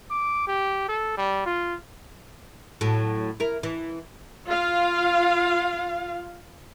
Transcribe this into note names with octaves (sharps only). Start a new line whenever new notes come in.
D6
G4
A4
G3
F4
A2 F#3
E4 A#4
E3
F4 F5